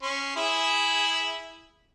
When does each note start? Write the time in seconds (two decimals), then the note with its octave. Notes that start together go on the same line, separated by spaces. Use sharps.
0.02 C#4 C6
0.36 E4 G#4 E5